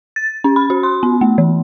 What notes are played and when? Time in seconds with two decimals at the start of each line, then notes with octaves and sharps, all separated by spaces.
0.16 A6
0.44 C#4
0.56 B5
0.70 F#4
0.83 C6
1.03 B3
1.21 A3
1.38 E3